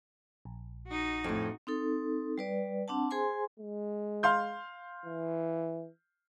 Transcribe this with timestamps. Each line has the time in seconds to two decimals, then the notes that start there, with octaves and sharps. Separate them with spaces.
0.45 A#1
0.88 D#4 F#4
1.24 F2 A2
1.67 C4 D#4 A4
2.38 G3 B4 D5
2.88 C4 D4 F#5 A5
3.11 G#4 C5 G#5 C6
3.60 G#3
4.23 F5 C6 G6
5.05 E3